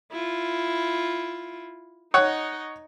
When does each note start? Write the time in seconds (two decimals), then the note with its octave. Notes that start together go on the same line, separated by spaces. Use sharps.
0.12 E4 F4
2.14 D#4 C#5 D#5 F#5